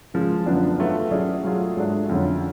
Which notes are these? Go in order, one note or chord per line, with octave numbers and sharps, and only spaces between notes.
C#3 F3 G#3
F#2 D3 F3 B3 D4
F#3 A3 F4 B4
F#3 C#4 G#4 D5
F#3 A3 F4 G#4
G#2 F#3 A3 D4
F2 D3 F#3 C#4